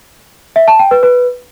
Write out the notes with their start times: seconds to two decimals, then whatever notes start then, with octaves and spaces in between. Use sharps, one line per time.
0.56 E5
0.68 A5
0.79 G5
0.91 B4
1.03 B4